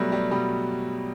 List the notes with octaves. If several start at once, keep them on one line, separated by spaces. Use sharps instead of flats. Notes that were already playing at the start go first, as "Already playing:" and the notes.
Already playing: B2 F#3 G3 A3 B3
G3
B2 G3